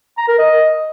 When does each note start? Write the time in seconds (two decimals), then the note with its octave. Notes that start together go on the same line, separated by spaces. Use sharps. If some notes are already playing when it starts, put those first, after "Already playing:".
0.17 A#5
0.28 A#4
0.39 D#5